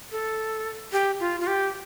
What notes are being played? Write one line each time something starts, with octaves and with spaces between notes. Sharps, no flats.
A4
G4
F4
F4
G4